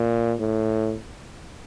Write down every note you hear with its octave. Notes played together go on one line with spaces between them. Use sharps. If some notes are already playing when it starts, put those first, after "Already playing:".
Already playing: A#2
A2